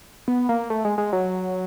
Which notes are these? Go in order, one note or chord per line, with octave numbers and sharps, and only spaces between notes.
B3
A#3
A3
G#3
G#3
F#3